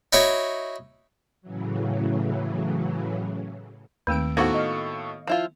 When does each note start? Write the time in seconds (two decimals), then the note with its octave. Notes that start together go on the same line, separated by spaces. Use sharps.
0.13 D#4 E4 F#4 C#5
1.42 A2 C#3 E3 F#3
4.07 D#2 D#3 A3 C4 E6 D7
4.37 A2 A#3 B3 D#4 F#4 A4 C5 C#6
4.54 D#5 F5
5.27 F3 E4 F4